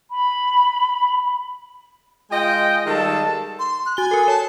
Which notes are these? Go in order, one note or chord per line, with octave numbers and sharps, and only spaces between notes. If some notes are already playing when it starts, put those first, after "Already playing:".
B5
G#3 F4 D#5 G5
D#3 G3 G#3 A4 F5 A5
C6
F#6
F#4 G#5 G7
A4 A#4
C#5 A5